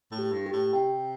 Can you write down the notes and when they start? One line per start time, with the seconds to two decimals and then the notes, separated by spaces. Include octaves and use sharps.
0.11 A2
0.19 G4
0.32 G2
0.46 G4
0.53 A2
0.73 C3 G5